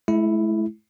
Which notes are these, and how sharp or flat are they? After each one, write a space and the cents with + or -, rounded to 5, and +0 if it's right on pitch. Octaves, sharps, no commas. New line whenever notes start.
G#3 +45 E4 +0